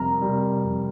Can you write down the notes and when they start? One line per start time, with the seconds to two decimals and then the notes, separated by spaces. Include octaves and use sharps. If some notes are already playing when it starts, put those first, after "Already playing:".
Already playing: F2 C3 G3 A#4
0.21 C3 G3
0.64 F2